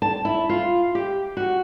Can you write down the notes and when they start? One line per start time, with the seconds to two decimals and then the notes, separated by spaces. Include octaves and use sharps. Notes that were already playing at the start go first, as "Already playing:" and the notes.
0.02 A5
0.25 E4
0.49 F4
0.95 G4
1.37 F#4